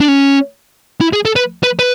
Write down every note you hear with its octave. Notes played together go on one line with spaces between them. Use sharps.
D4
C#4
E4
G#4
A4
B4
B4
B4